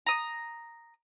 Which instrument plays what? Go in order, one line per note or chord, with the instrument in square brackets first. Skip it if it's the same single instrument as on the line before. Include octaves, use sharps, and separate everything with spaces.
[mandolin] A#5 D#6